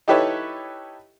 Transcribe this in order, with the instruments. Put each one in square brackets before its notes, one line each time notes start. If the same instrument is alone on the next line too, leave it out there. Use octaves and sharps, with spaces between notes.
[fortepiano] D#4 E4 G4 A4 B4 C#5